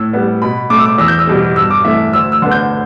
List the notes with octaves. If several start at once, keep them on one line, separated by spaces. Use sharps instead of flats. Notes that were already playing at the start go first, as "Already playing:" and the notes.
Already playing: A2 E6
G3 B3
B2 B5
A3 D6
E6
D6
E2 E6
G6
E6
B2 G3
G2 E6
D6
E3 A3 E5
D2 E6
E6
D3 B3
G6